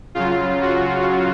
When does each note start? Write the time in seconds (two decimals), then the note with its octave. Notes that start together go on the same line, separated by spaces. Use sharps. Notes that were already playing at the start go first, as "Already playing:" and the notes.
0.15 C#3 F#3 F4
0.62 F#4